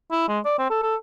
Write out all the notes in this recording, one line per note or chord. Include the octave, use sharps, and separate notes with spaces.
E4
G#3
D5
C4
A4
A4